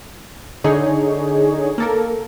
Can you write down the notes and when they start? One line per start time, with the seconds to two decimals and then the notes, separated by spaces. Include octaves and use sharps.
0.64 D3 D#4 G#4 C#5
1.78 A#3 A4 A#4